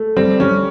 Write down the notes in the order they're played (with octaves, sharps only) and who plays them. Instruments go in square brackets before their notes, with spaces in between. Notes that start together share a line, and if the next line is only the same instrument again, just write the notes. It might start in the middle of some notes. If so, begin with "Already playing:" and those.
Already playing: [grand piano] A3
[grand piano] G3 [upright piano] C4
[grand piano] G3 [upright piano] C#4